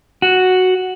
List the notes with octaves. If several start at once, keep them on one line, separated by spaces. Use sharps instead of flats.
F#4